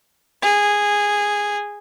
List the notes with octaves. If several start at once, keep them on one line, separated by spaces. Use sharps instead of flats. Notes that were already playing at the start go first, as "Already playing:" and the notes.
G#4